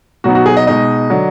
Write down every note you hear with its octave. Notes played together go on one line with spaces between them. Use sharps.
B2 F#3 B3 D#4 F#4
F#4
G#4
D#5
B2 G#3 D#4 D#5
D3 F#3 D4